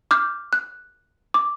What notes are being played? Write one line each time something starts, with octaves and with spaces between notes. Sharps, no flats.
D6 F6 G6
F#6
D6